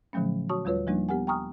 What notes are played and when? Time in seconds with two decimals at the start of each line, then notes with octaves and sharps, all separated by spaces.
0.13 A#2 D3 F3 F#3 A3 C#4
0.49 F#4 C#5 A5 C#6 D#6
0.65 D#2 G3 F4 B4 C#5
0.87 F3 G3 A#3 D4 D#4
1.09 B3 G4 A#4 F#5 G#5
1.27 G5 G#5 A#5 C#6 D#6 F6